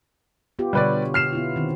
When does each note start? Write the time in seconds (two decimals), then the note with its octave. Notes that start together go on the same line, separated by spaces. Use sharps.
0.59 B3 F4 G4
0.73 B2 D3 G3 B4 C#5 D5
1.14 F6 C7 E7
1.33 B3 E4 F4
1.56 D#3 C4